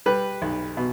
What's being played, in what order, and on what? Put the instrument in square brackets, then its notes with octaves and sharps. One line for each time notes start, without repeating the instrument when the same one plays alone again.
[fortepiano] G3 B4
B1
B2